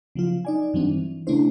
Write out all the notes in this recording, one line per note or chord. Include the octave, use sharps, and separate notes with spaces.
C#3 F3 F#3 F4
D#4 D5 G#5
G2 E3 F#3 G3 C4 D4
E3
C#3 A3 C#4 D4 E4 C5